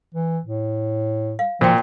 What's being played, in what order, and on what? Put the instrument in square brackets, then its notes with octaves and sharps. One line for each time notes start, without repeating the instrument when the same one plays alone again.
[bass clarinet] E3
A2
[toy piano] F5
[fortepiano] A#2 [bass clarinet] F3 [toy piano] F#4 C5 G5